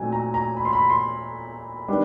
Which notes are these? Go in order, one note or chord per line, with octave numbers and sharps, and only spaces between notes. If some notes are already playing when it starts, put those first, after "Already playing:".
Already playing: A#2 F#3 A3 C4 D#4 G#5
A#5
A#5
B5
C6
B5
C6
D#3 G3 B3 D4